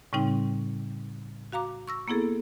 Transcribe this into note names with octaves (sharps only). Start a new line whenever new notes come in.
A2 C#3 G3 C4 D#4 G5
F#4 F5 A#5 D6
C#6 E6 A#6
A#3 B3 E4 G#4 A4